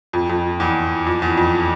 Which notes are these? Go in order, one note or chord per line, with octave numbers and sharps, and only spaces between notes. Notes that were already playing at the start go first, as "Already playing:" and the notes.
F2
F2
E2
F2
E2
F2